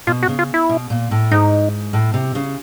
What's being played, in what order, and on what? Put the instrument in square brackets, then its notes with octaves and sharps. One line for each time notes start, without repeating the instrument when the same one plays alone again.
[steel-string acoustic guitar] B2 [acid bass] F4
[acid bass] F#4
[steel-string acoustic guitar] C#3
[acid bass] F4
E4
[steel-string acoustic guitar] B2
A#2
A2
[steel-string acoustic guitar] G#2 [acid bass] D#4
[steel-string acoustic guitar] A2
C3
C#3